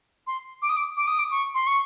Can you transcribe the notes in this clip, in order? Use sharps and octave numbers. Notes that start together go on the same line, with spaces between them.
C6
D6
D#6
D6
D6
D#6
D6
C#6
C6
C#6